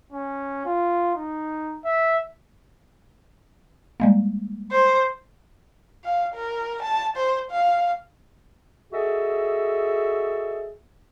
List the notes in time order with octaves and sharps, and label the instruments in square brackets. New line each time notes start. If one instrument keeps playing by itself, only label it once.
[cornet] C#4
F4
D#4
E5
[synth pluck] G3 G#3 A#3
[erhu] C5
F5
A#4
A5
C5
F5
[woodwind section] F#4 G#4 A4 D#5 E5